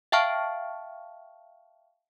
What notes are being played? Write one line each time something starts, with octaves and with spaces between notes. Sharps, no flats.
E5 F5 G5 A5 C#6 F6